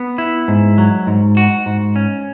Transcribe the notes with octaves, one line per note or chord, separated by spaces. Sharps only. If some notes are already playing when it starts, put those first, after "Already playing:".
Already playing: B3
E4
G#2
F#3
G#2
F#4
G#2
C#4